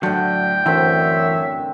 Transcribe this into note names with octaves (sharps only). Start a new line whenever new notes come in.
A2 D3 F#3 G5
F#2 D3 E3 C4 C#5 E5